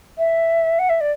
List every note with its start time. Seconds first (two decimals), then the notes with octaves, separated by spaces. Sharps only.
0.18 E5
0.79 F#5
0.89 E5
1.01 D5